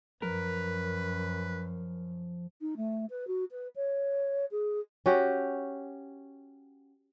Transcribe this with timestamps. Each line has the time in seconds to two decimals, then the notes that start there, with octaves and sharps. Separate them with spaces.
0.22 F#2 F3 A#4 B4
2.61 D#4
2.76 A3
3.09 B4
3.27 F#4
3.51 B4
3.75 C#5
4.51 G#4
5.06 C#4 F#4 G4